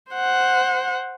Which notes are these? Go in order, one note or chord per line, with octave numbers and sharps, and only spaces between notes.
C5 F#5